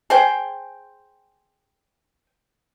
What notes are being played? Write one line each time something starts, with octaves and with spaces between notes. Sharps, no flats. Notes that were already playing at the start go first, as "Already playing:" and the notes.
G#4 C5 G5